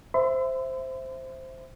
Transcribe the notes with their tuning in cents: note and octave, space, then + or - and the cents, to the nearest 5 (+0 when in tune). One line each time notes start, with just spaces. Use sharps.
C5 +0 E5 +5 C6 -45